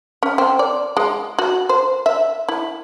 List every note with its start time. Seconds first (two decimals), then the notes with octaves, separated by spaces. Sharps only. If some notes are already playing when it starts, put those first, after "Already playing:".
0.23 C#4
0.38 C4
0.59 D5
0.97 G#3
1.39 F#4
1.69 C5
2.06 E5
2.48 E4